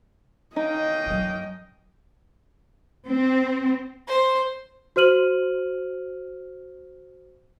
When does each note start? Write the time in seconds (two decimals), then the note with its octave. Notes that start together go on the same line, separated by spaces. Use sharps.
0.56 A#3 C#4 D#4 D#5 G5
1.06 G2 F#3
3.08 C4
4.09 C5
4.96 F#4 C5 F6 D#7 F#7